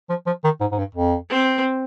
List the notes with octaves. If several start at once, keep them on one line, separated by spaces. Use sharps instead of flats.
F3
F3
D#3
G#2
G#2
G2
F2
C4